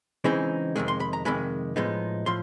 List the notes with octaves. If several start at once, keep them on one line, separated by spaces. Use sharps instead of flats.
C#3 E3 G#3 C4 D#4
F2 C3 D#3 G#3
C6
B5
A#5
F2 C3 D#3 G#3 B5
A2 F3 G#3 B3 D#4
A2 F3 C6